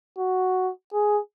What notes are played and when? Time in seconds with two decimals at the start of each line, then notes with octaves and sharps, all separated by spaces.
0.19 F#4
0.93 G#4